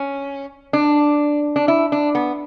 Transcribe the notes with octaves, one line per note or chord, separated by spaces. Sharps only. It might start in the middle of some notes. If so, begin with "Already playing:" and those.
Already playing: C#4
D4
D4
E4
D4
B3